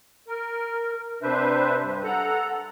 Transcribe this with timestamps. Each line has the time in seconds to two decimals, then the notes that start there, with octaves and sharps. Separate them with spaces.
0.28 A#4
1.23 C3 D4 B4 C5 E5
1.80 G2
2.04 A4 F#5 A#5